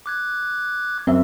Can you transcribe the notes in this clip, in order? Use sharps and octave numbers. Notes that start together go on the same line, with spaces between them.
D6 F#6 G#6
F#2 C4 E5